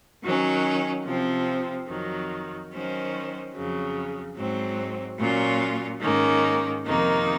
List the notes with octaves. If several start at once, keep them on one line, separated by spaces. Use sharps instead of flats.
D#3 F#3 C#4
C3 F3 C4
F2 D#3 F#3
D#3 F#3 C#4 F#4 C5
F2 C#3 F#3
G#2 F#3 C4
A#2 F#3 C#4 F4
G#2 D#3 A#3 C#4
F2 C3 D#3 A#3 D#4